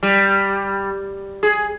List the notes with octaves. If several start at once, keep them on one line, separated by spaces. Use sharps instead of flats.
G3
G#4